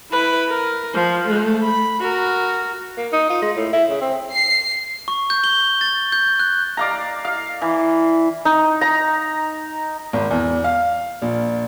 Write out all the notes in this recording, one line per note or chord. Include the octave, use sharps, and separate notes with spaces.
E4 B4
A#4
F3
A3
B5
F#4 A#4
A#3
D#4
F4
G#3
A2
E4
C#3
C4
C7
C#6
G6
G7
A6
G6
F#6
D5 F5 A#5
F5
E3
D#4
A#5
G#1
E2
F5
A#1